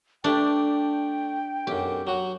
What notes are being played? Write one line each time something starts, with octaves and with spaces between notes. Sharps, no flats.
A3 D4 G4 D5 G5
B1 F#2 G4
F#3 F#4